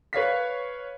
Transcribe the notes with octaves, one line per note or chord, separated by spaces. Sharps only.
B4 C#5 F5 B6